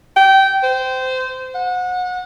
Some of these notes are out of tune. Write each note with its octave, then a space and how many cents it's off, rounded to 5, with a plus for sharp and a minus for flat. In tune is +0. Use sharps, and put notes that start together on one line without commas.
G5 -20
C5 -20
F#5 -30